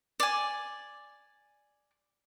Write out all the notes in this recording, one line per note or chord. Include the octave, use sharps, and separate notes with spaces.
D5 G#5